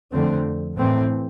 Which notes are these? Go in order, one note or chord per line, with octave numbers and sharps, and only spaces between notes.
F2 D3 A3 C4
A2 E3 A3 C4